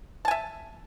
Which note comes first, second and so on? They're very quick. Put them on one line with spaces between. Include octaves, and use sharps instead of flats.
A5 G#5 E5